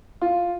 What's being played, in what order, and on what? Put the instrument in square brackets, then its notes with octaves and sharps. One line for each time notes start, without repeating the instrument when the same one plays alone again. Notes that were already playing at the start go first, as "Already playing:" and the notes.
[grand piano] F4